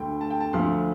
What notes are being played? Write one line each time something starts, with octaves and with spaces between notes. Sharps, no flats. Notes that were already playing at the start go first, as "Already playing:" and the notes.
Already playing: D2 D3 A3 G5
A5
G5
A5
D2 D3 F3 A3 C6